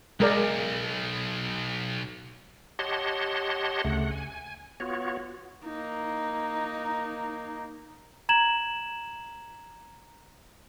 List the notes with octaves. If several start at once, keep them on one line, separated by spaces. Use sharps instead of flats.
B1 G#3 A#4 D5
G4 C#5 D#5 F#5 A5 C6
D2 C#3 A3 F#5
G#5
B3 F4 F#4 C#5
A#3 D#4
A#5 G#6 E7 F#7